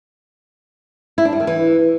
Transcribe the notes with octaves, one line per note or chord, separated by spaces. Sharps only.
E4
D4
G3
D#3
E3